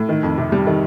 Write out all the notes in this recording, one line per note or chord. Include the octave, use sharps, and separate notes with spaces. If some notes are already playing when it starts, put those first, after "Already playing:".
Already playing: A2
D#3
F2
C3
G3
D#3